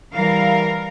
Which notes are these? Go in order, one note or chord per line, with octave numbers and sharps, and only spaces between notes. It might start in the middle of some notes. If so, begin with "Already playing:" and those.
E3 G3 A#4 F5